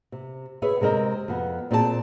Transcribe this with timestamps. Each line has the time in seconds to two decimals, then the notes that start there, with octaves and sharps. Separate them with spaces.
0.12 C3
0.62 G#4 B4 C#5 E5
0.81 C3 G#3 C4 A#4 D#5
1.28 F2 B3
1.71 A#2 C4 G#4 D5 A5